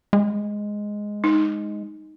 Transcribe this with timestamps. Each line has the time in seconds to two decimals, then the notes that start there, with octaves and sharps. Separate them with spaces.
0.13 G#3
1.24 D#4